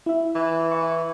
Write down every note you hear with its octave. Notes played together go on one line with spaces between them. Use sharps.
E4 E5
E3
E5 C#6